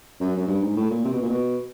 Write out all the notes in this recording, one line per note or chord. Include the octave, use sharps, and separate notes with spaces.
F#2
F#2
G2
G#2
A2
A#2
C3
B2
A#2
B2